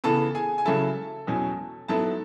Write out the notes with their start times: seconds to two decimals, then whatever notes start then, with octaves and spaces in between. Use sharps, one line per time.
0.04 C#3 E3 B3 A4 A5
0.35 G#4 G#5
0.58 G#5
0.65 C#3 F#3 C#4 E4 A4 A5
1.27 E2 B2 F#3 C#4
1.88 G#2 F#3 B3 E4 A4 A5